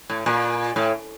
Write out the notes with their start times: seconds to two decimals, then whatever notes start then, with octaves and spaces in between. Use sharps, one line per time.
0.10 A2
0.26 A#2
0.76 A2